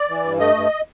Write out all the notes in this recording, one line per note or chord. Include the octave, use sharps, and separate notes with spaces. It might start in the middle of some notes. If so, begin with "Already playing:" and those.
Already playing: D5
E3
G2
A3 D#5
G2